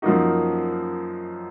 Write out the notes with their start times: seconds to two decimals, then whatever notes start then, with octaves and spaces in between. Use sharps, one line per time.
0.02 F#2 F3 A#3 D#4 F#4